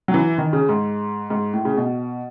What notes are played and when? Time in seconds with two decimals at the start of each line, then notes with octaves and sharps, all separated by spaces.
0.08 F#3
0.14 E3
0.38 D#3
0.53 C#3
0.69 G#2
1.30 G#2
1.54 A2
1.65 C#3
1.77 B2